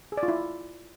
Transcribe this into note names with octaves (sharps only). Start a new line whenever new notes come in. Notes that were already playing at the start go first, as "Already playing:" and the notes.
G#4
D5
F4
E4